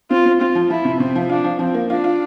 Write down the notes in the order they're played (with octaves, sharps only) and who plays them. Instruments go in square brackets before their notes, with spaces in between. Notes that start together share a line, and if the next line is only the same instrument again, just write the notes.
[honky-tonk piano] C4 [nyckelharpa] F4
[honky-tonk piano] C4
[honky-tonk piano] C4 [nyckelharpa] F4
[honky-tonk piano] F3
[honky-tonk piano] F3 [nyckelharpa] E4
[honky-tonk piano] C3
[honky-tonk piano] C3 [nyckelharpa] C4
[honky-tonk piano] F3
[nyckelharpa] D4 [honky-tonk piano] F4
[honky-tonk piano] F3
[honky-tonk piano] F3 [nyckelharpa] C4
[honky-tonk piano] A#3
[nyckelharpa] D4 [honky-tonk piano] F4
[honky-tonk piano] F4